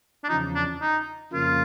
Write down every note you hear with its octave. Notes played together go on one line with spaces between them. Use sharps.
D4
E2 C#3 F3 D#4
D4
D#4
F2 C#3 F3 A#3 F4